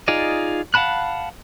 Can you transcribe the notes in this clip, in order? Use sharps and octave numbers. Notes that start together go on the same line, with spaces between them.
D#4 F4 G#4 D5 D#5
F5 F#5 A5 B5 F#6